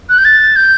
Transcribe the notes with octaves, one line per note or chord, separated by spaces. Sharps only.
F#6
G6
A6
G6